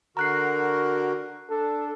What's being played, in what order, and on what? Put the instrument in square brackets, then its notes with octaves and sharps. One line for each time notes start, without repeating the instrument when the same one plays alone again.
[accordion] D3 F#4 A#4 [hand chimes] A#5 F#6 C7
[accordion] D4 [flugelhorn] A4